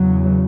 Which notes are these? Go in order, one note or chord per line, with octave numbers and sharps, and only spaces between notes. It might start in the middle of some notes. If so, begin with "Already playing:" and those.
Already playing: E2 C#3 F#3